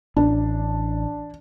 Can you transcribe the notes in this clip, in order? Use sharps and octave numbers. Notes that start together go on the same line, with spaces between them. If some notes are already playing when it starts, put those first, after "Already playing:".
A1 D4